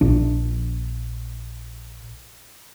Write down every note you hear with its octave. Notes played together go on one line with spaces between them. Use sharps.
A#1 D4